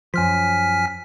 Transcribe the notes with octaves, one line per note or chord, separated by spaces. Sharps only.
F#2 F3 G#5 F6 B6